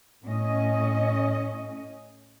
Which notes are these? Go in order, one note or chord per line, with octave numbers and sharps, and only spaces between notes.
A2 C#4 D#5